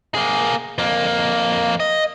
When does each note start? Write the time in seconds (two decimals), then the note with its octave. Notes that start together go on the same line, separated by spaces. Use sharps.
0.15 A#3 G#4
0.78 F2 A#3
1.80 D#5